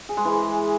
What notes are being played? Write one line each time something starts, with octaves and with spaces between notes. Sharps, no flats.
G#4
G#3
E3